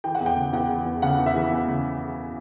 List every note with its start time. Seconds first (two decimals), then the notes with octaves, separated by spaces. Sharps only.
0.04 E3 G5
0.15 F#5
0.20 E2
0.26 G5
0.36 C#3
0.53 E2 F#5
0.69 E3
0.86 E2
1.02 C#3 F#5
1.19 E2
1.26 E5
1.35 E3
1.51 E2
1.68 C#3